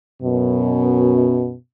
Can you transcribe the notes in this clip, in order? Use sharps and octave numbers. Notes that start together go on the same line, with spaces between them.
F#2 B2